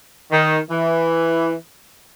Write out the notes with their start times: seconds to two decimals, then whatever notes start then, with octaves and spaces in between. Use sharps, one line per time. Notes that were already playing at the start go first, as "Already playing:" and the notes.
0.31 D#3
0.70 E3